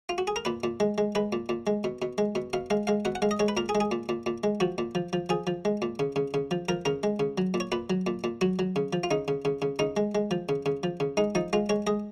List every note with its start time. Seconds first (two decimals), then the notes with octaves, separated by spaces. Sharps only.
0.09 F4
0.18 F#4
0.27 G#4
0.36 A#4
0.45 A#2 B4
0.64 A#2
0.80 G#3
0.98 G#3
1.15 G#3 B4
1.33 A#2
1.49 A#2
1.67 G#3
1.84 B2
2.02 B2
2.18 G#3
2.35 B2
2.53 B2 F5
2.70 G#3 F5
2.87 G#3 F5
3.05 B2 F#5
3.15 F#5
3.22 G#3 F5
3.31 D#5
3.39 G#3 C#5
3.48 B4
3.57 A#2 A#4
3.69 G#4
3.75 G#3
3.80 G#4
3.91 A#2
4.09 A#2
4.26 A#2
4.44 G#3
4.60 F3 F#4
4.78 A#2
4.95 F3
5.13 F3
5.29 F3 G#4
5.47 F3
5.65 G#3
5.82 A#2
5.99 C#3
6.16 C#3
6.34 C#3
6.51 F3
6.69 F3 A#4
6.85 C#3 A#4
7.03 G#3
7.20 C#3
7.38 F#3
7.54 A#2
7.60 C#5
7.72 A#2 B4
7.90 F#3
8.07 A#2
8.24 A#2
8.41 F#3 F#4
8.59 F#3
8.76 C#3
8.93 F3
9.04 F4
9.11 C#3 D#4
9.28 C#3
9.45 C#3
9.62 C#3
9.79 C#3 D#4
9.97 G#3
10.15 G#3
10.31 F3
10.49 C#3
10.66 C#3
10.83 F3
11.00 C#3
11.17 G#3 D#4
11.35 F3 D#4
11.53 G#3 F4
11.69 G#3 C#5
11.87 G#3 D#5